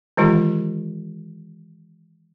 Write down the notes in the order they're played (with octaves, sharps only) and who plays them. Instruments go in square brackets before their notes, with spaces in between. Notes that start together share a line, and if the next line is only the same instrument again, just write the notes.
[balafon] D#3 E3 G#3 F4 G4